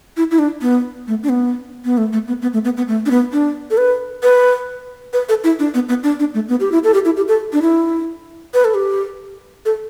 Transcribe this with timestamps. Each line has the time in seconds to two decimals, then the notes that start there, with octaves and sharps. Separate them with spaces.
0.17 E4
0.31 E4
0.39 D4
0.62 B3
1.08 A3
1.23 D4
1.29 B3
1.85 B3
1.98 A3
2.13 A3
2.28 B3
2.42 B3
2.53 A3
2.65 B3
2.77 B3
2.88 A3
3.06 D4
3.11 B3
3.33 D4
3.71 A4
3.78 B4
4.23 B4
5.13 B4
5.29 A4
5.44 E4
5.59 D4
5.74 B3
5.89 B3
6.03 D4
6.20 D4
6.35 A3
6.49 B3
6.60 G4
6.72 E4
6.84 A4
6.94 G4
7.05 E4
7.17 G4
7.28 A4
7.53 D4
7.62 E4
8.54 B4
8.65 A4
8.74 G4
9.65 A4